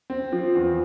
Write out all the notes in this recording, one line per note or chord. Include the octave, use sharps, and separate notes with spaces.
C4
F3
E2